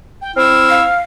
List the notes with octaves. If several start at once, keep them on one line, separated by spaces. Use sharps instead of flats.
G5
C4 E4 F6
F5